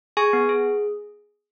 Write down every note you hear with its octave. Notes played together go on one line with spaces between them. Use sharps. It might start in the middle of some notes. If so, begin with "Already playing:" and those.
G#4 G#5 C#6
B3
G#4